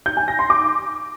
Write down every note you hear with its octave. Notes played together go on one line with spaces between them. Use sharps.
G6
G#5
A#6
C6
D6